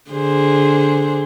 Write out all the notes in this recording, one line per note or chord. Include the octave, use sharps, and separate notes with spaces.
D3 G#4 C5